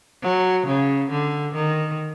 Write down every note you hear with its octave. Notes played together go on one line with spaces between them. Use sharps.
F#3
C#3
D3
D#3